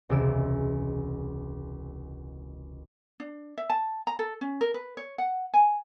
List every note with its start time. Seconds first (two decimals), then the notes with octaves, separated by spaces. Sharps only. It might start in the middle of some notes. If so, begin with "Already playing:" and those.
0.09 E1 C#2 C3 E4 E6 D7
3.20 D4
3.58 E5
3.70 A5
4.07 A#5
4.19 A4
4.41 C#4
4.61 A#4
4.74 B4
4.97 C#5
5.18 F#5
5.54 G#5